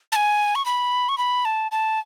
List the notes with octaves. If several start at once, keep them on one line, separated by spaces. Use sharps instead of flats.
A5
G#5
C#6
B5
C#6
B5
A5
A5